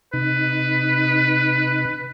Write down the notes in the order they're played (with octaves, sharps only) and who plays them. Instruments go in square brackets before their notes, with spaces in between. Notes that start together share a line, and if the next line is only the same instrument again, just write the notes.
[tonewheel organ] C3 D#4 [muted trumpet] B4